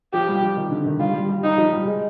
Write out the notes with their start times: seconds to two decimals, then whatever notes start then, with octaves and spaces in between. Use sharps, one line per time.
0.13 F3 G4
0.28 G3
0.42 F3
0.57 D#3
0.71 D3
0.86 D#3
0.99 G3 F4
1.14 G3
1.29 G3
1.44 D#4
1.58 F3
1.73 G3
1.86 G#3